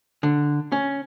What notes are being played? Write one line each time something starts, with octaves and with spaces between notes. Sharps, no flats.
D3
C#4